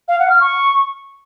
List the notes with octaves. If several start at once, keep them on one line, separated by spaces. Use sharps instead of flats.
F5
F#5
F6
C#6